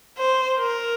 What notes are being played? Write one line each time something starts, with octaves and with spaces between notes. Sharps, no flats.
C5
A#4